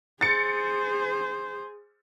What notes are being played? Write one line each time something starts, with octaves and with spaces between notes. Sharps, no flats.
G#4 C5 A6 C#7